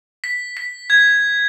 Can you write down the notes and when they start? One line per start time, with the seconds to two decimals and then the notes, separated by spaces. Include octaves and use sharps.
0.24 B6
0.57 B6
0.90 G#6